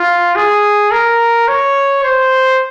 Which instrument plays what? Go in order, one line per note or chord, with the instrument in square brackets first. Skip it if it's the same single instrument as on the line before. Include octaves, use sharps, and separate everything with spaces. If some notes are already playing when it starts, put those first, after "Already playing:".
Already playing: [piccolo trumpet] F4
G#4
A#4
C#5
C5